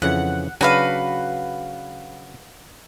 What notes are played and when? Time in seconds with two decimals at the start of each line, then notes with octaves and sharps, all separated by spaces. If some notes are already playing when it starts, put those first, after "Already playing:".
0.02 F2 C#3 E3 F#5
0.61 C#3 F#3 D4 F#4 B4 F5